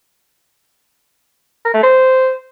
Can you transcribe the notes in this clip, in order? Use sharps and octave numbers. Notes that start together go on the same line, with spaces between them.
A#4
A3
C5